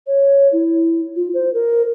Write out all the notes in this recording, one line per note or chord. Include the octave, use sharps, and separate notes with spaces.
C#5
E4
F4
C5
A#4